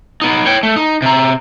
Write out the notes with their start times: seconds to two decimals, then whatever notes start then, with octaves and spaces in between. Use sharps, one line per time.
0.22 B3 D#4
0.46 C#5 G5
0.63 A3
0.76 D#4
1.02 C3 A#5